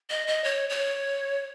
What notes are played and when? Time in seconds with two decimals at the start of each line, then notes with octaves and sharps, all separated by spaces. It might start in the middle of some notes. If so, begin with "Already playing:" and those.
0.10 D#5
0.27 D#5
0.44 C#5
0.70 C#5